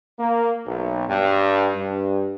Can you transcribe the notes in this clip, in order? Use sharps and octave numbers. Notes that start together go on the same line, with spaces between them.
A#3
B1
G2
G2